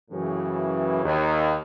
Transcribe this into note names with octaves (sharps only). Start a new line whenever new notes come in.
F#2 A2 C#3 E3
D#2